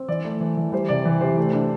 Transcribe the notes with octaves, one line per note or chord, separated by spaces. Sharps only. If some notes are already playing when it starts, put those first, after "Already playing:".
Already playing: C4
E3 D5
A3
E3
E3
G3 C5
C3 D5
E3
C3 C5
A3
D4